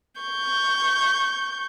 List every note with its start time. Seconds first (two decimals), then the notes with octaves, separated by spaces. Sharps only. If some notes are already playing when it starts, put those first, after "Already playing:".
0.21 C#6 G6